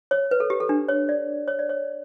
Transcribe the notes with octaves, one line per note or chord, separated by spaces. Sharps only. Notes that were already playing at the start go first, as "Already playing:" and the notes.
C#5
B4
A4
G4
A4
D4
C#5
D5
C#5
D5
C#5